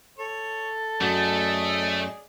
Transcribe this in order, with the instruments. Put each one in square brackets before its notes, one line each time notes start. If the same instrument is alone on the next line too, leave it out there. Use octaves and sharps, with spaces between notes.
[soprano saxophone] A4 [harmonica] C#5
[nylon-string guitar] F#2 [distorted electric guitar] A3 [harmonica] G#4 D5 D#5